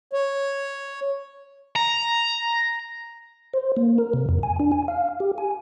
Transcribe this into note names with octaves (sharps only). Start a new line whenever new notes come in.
C#5
A#5
C5
A#3
A#4
C3
F2
G#5
D4
G#5
F5
G4
G#5